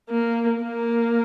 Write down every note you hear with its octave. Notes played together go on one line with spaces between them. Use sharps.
A#3
A#3